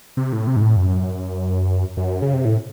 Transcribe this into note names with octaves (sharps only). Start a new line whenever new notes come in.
C3
A2
C3
G#2
A2
F#2
F#2
C#3
C3
A2